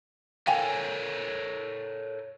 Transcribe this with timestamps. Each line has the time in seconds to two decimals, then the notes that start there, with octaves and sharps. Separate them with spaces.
0.47 A4 A#4 C#5 F5 G5 G#5